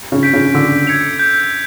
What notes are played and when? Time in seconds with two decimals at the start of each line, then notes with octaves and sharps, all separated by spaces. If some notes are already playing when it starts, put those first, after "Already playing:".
0.12 C#3
0.23 G6 B6 D7
0.33 C#3
0.55 D3 E6
0.87 G#6 C#7 F7
1.19 G6